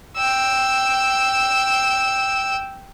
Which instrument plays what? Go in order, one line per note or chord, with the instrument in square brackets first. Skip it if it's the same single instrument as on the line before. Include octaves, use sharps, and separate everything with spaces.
[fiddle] G5 E6